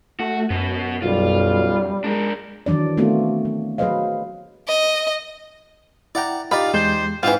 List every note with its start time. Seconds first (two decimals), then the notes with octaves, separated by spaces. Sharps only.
0.20 A3 F#4
0.50 F#2 B2 B3
1.02 B1 G3 F4
2.04 G#3 D4 A#4
2.66 D#3 E3 F#3 D4 D5
2.97 A3 B3 C4 F4 F#4
3.45 F#3
3.78 F#3 G#4 B4 C5 D#5 F5
4.68 D#5
6.15 E4 D5 F#5 G5 A#5
6.51 D#4 F4 G4 D5 B5
6.74 E2 G#3 C5 G6
7.23 G#2 E3 C4 F4 F#5 G5